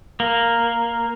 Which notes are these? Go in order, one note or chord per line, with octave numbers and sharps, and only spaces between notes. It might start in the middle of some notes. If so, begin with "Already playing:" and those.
A#3